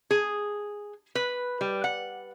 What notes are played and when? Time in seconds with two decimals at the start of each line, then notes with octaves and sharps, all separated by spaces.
0.11 G#4
1.15 B4
1.61 G3
1.84 F#5